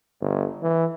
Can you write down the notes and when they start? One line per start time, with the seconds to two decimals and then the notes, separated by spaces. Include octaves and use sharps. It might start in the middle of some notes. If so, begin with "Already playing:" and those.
0.21 G1
0.62 E3